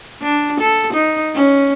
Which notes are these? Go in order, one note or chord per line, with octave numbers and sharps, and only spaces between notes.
D4
A4
D#4
C#4